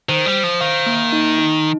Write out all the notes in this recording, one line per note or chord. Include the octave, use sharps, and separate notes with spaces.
D#3 C5
G3
C5
F3
D#3 F5
A#3
D#4
D#4